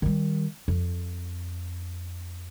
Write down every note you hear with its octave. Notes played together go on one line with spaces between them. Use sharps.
D#3 G3
F2